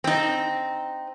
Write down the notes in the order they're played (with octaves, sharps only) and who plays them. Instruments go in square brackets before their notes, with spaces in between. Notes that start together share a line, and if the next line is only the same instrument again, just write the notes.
[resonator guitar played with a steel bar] C4 D#4